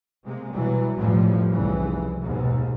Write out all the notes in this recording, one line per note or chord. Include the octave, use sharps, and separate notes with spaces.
C3 G#3 A#3
B2 E3 F#3 G3
A1 F2 A2 F3 G3
F1 C2 C#3 E3
D#2 G#2 B2